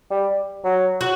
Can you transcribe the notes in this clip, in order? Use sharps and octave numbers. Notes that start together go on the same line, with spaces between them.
G3
F#3
F#4